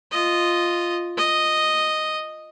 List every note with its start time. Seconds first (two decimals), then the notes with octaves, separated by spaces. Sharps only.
0.12 F4 D#5
1.17 D#5